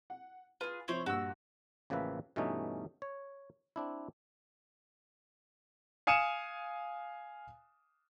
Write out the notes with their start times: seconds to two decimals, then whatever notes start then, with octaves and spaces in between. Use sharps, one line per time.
0.10 F#5
0.61 F4 G#4 B4
0.88 C3 F3 E4 C5 C#5 F#7
1.06 G2 A#2 F#4 E6
1.90 A1 C#3 F3 A#3 B4 E5
2.36 G2 B2 E3 A3 C#4 D#4
3.02 C#5
3.76 C4 D4 E4
6.07 F5 G#5 D#6 C#7 D#7 E7